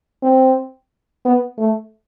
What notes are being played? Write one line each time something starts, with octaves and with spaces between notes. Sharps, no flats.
C4
B3
A3